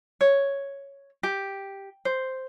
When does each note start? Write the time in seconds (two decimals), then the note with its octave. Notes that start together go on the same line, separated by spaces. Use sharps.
0.21 C#5
1.23 G4
2.05 C5